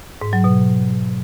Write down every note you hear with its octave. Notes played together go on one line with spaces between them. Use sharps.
G#2
F#3
B2